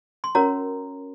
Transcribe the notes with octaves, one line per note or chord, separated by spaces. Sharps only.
C6
C#4 F#4 A#4 C#5 A#5